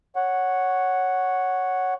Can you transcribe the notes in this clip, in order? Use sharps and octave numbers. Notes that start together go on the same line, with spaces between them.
C#5 F#5